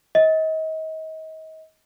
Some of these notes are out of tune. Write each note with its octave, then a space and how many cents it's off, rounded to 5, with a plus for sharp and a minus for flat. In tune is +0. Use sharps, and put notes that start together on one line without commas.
D#5 +35